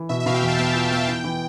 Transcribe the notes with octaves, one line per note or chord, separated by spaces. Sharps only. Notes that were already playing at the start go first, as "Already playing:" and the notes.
Already playing: E3
B2 E5
E5
B2 F5
G5
E2
A5
B3 G5
F4 A5
B3 A5
E3 G5
E3